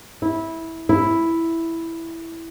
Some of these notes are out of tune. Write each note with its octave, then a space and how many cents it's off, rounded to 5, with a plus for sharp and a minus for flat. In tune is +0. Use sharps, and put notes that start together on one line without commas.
E4 -15
E4 +0